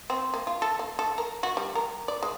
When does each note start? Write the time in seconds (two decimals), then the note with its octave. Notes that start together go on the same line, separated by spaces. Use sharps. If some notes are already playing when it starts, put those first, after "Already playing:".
0.10 C4
0.34 A#3
0.47 F4
0.62 A4
0.79 A#3
0.99 A4
1.18 A#4
1.43 F#4
1.57 G3
1.75 A#4
2.08 D5
2.23 G#3